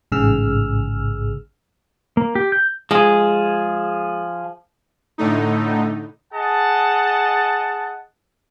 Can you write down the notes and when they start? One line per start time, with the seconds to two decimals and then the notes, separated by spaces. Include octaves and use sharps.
0.12 A1 G#2 C#3 G#4 E6 F6
2.17 A#3
2.35 G4
2.52 G6
2.91 F3 G#3 G#4
5.18 A2 D3 A3 D#4
6.34 G#4 D#5 F#5 A5